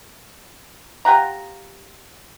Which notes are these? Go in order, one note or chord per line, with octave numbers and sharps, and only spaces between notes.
F4 G4 F#5 A#5